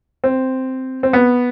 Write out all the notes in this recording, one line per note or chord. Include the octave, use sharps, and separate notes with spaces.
C4
C4
B3